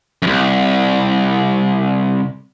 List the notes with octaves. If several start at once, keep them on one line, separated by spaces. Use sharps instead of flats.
C2 F#2